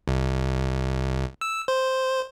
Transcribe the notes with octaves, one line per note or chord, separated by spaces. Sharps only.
C2
E6
C5